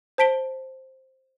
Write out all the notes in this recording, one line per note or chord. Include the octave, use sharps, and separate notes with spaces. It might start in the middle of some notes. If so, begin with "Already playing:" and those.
C5 A5 B6 D7 G7